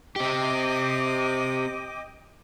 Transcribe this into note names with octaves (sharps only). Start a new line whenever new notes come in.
C4 G4 D#5 G5 D6